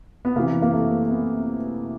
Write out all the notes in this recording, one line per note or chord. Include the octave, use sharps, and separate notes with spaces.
B3
C3 E3 A#3
A#3
A3
B3